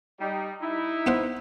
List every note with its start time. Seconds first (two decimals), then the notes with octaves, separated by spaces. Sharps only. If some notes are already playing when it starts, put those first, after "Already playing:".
0.19 G3 D#4
0.60 D#4 E4
1.07 B3 C5 F#5